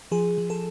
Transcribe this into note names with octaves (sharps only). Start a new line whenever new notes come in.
F3 G#4
F3
A4